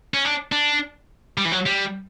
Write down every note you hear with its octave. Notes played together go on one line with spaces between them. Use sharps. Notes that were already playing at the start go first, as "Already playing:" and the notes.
C#4
D4
D4
G3
E3
F#3
G3